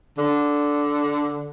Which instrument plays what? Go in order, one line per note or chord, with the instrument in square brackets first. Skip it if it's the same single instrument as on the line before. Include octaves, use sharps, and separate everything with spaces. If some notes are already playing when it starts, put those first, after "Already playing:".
[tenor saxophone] D3